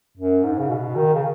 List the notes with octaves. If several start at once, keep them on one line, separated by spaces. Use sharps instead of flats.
F#2
G#2
C#3
B2
D#3
C#3